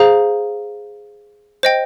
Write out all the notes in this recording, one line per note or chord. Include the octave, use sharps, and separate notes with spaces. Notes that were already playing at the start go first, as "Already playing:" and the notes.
Already playing: G#4 C5 F5 A#5
C5 D#5 G5